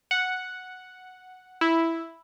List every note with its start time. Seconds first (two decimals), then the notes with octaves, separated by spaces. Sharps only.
0.11 F#5
1.61 E4